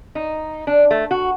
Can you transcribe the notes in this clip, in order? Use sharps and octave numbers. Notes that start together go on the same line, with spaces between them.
D#4
D4
A3
F#4